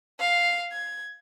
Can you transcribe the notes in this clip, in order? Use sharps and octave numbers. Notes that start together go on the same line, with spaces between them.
F5 C7
G#6